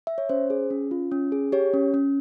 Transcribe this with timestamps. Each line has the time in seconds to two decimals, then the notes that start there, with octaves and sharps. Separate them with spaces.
0.07 E5
0.18 C#5
0.29 C#4 C5
0.50 G#4
0.70 C#4
0.91 F4
1.12 C#4
1.32 G#4
1.52 G4 C#5
1.74 C#4
1.94 C#4